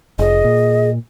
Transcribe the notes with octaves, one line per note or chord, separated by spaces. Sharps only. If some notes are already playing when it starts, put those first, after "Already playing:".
F1 G#4 D#5
A#2